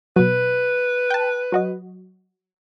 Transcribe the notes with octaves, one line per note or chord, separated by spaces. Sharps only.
B2 F#3 B4
G5 A5
F#3 F#4 D#5